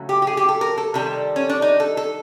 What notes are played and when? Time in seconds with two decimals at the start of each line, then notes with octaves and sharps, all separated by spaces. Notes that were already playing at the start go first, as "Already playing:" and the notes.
Already playing: C#3 F#3 A3
0.09 G4
0.22 G4
0.27 G#4
0.37 G4
0.49 A4
0.61 A#4
0.78 A4
0.94 C3 D#3 G3 A4
1.36 C#4
1.49 D4
1.62 D#4
1.80 A4
1.97 A4